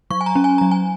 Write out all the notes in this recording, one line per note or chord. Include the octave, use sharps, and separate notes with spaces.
F#3 C#6
G#5
A#5
C#4
G#5
F#3 A#5
G#5